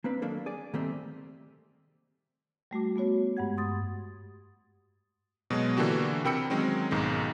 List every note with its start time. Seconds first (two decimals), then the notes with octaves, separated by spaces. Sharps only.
0.04 A#3 C4 D4 B4
0.22 D#3 F#3 A#3 D4 A4
0.46 G#4 D5
0.74 D#3 G3 A3 A#3 C4
2.71 G3 A3 F#4 D6
2.96 A3 B3 F#4 C#5
3.37 G2 G#3 F#5 G#6
3.57 C6 D#6 A6
5.50 B2 F#3 G#3
5.77 D3 E3 A#3 D4 F#4 G4
6.24 C3 A#4 G5 B5 E6 C#7
6.50 D#3 F#3 G#3 C4 C#4
6.91 B1 G#2 D#3 G#3